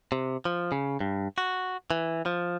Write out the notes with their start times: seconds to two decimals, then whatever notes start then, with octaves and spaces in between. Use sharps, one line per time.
0.12 C3
0.45 F3
0.72 C#3
1.00 G2
1.38 F#4
1.91 E3
2.26 F3